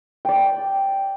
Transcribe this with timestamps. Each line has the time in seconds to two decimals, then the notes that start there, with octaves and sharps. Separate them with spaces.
0.25 D5 G5